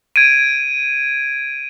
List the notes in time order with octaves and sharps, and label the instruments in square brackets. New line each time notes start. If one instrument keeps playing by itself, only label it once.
[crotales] G#6 D7 D#7